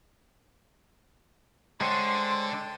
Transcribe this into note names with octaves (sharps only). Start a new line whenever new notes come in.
D3 G#3 C5 C#5 G5 A5 C6